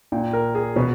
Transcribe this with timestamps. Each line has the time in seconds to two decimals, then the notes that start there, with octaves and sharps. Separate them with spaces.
0.12 A#2 G5
0.33 A#4
0.55 G#4
0.76 B2 B4